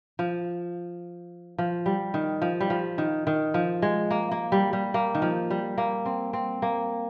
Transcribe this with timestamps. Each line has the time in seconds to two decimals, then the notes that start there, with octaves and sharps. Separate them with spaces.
0.19 F3
1.58 F3
1.86 G3
2.14 D#3
2.42 F3
2.60 G3
2.70 F3
2.98 D#3
3.27 D#3
3.54 F3
3.82 G#3
4.11 A#3
4.31 A#3
4.52 G3
4.73 G3
4.94 A#3
5.15 D#3
5.22 F3
5.50 G3
5.78 A#3
6.06 C4
6.33 C4
6.62 A#3